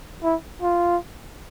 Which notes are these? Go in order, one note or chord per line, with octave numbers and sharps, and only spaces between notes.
E4
F4